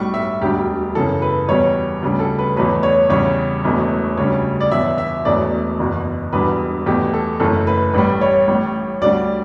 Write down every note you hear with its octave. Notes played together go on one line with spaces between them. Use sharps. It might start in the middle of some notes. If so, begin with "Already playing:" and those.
Already playing: B1 A2 G3 C#6
E5
E1 D2 D3 G3 G4
F#2 C#3 E3 A4
B4
E2 B2 G3 C#5
D2 C#3 G3
A4
B4
E2 B2 F#3 A3 B4
C#5
E2 C#3 G3 C#5
E1 E2 B2 A3
D2 C#3 G3 C#5
D5
E2 B2 F#3 E5
E5
E1 E2 B2 F#3 A3 D5
F#1 E2 B2
E1 E2 D3 G3 B4
E2 B2 A3 G4
A4
F#1 F#2 E3 A3 A4
B4
A1 A2 G3 B4
C#5
A1 A2 G3
D2 D3 G3 D5